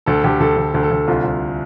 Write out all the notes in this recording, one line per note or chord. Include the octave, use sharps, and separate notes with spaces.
D2 A4
D2 G4
D2 A4
D2
D2
A4
D2
C2 F4
C2